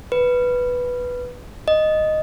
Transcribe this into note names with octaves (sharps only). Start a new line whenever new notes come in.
B4
D#5